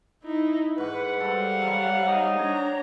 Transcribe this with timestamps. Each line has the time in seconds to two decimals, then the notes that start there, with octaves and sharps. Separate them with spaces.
0.24 D#4 E4
0.78 G#2 B4 F#5 C#6
1.20 G3 A4 C5 F5
1.62 F#3 G4 C5
2.08 D#4
2.39 D4 C#5 A#5